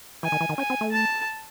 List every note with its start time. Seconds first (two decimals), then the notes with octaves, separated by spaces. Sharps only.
0.23 E3 G#5
0.32 D#3
0.41 E3
0.49 D#3
0.57 C#4 G#5
0.70 C4
0.81 A3
0.92 A5